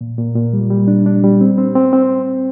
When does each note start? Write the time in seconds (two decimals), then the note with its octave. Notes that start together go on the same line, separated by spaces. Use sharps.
0.01 A#2
0.18 A#2
0.35 A#2
0.53 G3
0.70 G3
0.88 D4
1.06 D4
1.24 G3
1.41 C4
1.58 C4
1.76 C4
1.93 C4